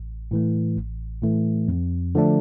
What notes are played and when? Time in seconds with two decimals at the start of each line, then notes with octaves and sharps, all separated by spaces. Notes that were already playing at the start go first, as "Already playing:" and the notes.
Already playing: A1
0.31 A2 E3 A3
0.77 A1
1.22 A2 E3 A3
1.68 F2
2.15 D3 F3 A3 D4